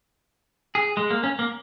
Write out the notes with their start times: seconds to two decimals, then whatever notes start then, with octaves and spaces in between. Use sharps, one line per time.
0.75 G#4
0.97 G#3
1.11 A#3
1.24 C#4
1.39 A#3